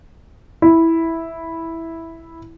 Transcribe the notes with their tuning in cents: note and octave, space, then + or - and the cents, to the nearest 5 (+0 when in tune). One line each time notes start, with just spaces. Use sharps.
E4 -5